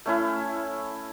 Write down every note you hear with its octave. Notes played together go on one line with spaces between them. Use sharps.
A3 C#4 E4